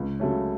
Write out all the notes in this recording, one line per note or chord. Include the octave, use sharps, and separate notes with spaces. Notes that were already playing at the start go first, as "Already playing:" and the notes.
Already playing: C#2
C#3 F#3 A3 C#4